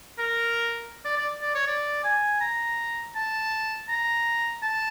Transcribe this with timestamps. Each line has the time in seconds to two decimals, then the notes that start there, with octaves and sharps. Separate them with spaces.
0.18 A#4
1.05 D5
1.17 D5
1.42 D5
1.55 C#5
1.67 D5
2.04 G#5
2.41 A#5
3.15 A5
3.89 A#5
4.63 A5